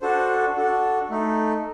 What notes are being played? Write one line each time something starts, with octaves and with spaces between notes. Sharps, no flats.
D4 F#4 A4 C5
D4 F#4 A4
A3 D#4 A4